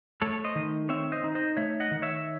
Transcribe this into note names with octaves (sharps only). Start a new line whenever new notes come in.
A3 A4 C#5
C5 D#5
D#3
C4 C#5 E5
C5 D#5
D#4
C5 D#5
A3 C#5 E5
D#5 F#5
D#3
C#5 E5